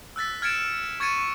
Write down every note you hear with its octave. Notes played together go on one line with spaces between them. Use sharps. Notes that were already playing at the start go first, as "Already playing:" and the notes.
E6 F#6 A6 B6
F6 G#6 A6 C#7 D7 E7
C#6 G#6 A6 C#7 D#7